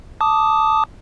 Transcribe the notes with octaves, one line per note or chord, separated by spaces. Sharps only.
A5 D6 D#6